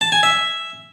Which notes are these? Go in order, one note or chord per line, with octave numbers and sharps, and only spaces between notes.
A5
G#5
E5